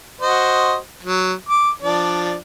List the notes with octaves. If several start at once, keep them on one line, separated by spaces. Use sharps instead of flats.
F#4 C5 D#5
F#3
D6
F3 D4 D5